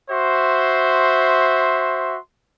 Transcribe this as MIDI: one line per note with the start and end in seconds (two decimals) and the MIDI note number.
0.10 2.18 66
0.10 2.18 72
0.10 2.18 76
0.10 2.18 84